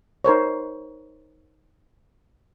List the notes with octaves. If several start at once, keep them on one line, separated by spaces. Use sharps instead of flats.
D#4 A#4 C5 C#5